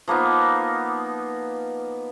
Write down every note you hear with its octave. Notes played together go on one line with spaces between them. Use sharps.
F3 A#3 B3 D#4